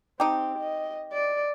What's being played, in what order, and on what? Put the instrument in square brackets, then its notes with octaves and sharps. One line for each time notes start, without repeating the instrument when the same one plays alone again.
[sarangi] C4 [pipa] D#4 G4
[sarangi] D#5
D5